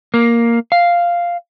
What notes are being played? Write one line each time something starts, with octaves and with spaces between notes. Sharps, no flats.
A#3
F5